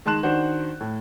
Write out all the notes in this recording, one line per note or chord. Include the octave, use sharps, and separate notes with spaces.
D#3 G#3 A5 C6 F#6 E7
D#3 D4 F#4 C5
A2